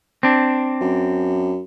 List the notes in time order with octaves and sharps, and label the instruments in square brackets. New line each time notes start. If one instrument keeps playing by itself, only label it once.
[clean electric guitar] C4 D4
[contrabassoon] F#2